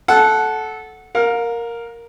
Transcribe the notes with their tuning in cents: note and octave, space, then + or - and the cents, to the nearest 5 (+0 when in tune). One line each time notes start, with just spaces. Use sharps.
A4 -15 F#5 +0
A#4 +0 F5 +35